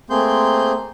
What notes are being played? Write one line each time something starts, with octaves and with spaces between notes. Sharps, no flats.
A3 A#3 C4 G#4 C6 G6